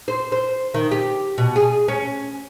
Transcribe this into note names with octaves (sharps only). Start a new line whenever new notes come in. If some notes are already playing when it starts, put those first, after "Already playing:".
C5
C5
D#3
G4
B2
G#4
C#4